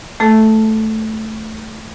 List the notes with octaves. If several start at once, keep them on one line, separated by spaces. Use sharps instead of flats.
A3 A4